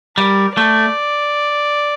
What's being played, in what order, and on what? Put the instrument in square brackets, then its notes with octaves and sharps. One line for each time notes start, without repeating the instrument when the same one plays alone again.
[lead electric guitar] G3 [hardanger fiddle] A#4
[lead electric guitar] A3 [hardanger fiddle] D5